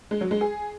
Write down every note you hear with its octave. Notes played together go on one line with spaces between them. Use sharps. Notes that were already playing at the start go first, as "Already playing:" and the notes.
G#3
F#3
G#3
G#4